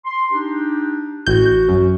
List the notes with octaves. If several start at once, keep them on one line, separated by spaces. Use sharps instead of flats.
C6
D4 D#4 G4
A1 F#4 G6
F#2